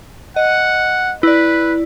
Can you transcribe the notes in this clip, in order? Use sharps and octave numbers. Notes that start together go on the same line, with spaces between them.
D#5 F#5
E4 B4 D5